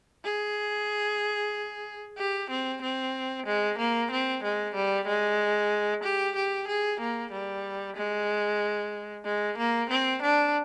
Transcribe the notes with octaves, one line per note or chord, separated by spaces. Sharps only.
G#4
G4
C4
C4
G#3
A#3
C4
G#3
G3
G#3
G4
G4
G#4
A#3
G3
G#3
G#3
A#3
C4
D4